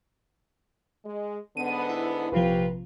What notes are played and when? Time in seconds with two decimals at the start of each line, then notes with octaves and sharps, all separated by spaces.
1.05 G#3
1.57 G#2 D3 B3 D#7
1.89 E4
2.32 A#1 C3 F3 F4 G4 B4